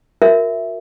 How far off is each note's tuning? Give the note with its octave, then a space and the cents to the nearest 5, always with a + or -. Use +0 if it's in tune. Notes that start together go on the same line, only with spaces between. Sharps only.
F#4 -30 A#4 +0 E5 +0